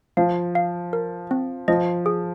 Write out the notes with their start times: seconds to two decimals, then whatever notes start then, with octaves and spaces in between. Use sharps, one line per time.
0.17 F3 F5
0.55 F5
0.93 A#4
1.31 C4
1.68 F3 D#5
2.06 G#4